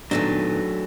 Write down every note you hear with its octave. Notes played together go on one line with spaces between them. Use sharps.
A#2 D#3 F#3 A3 B3 D4